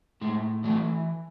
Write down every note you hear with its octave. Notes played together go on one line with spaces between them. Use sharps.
A2 G#3
E3 F#3 A3